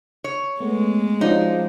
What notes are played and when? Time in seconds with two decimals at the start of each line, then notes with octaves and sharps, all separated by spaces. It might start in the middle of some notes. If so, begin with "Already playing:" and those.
0.24 C#5
0.60 G#3 A3 B3
1.21 F3 C#4 D#4 F#4 D5